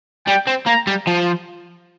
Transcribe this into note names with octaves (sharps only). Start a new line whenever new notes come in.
G3 G5
C4
A#3 A#5
G3
F3